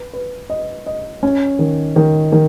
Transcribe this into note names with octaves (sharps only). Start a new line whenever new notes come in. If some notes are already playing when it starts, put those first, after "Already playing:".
Already playing: B4
B4
D#5
D#5
C#4
D#3
D#3
D#3